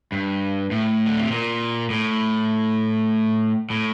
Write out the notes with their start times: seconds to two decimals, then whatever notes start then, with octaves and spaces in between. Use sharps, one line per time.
0.12 G2
0.71 A2
1.06 D3
1.19 C3
1.31 A#2
1.90 A2
3.70 A2